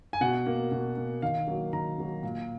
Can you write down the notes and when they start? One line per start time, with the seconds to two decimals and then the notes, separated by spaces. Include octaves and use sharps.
0.13 G#5
0.21 B2 F#5
0.46 A#3
0.72 B2
0.97 A#3
1.22 D#3 F5
1.47 F#3 A#3
1.73 D#3 A#5
1.98 F#3 A#3
2.23 A#2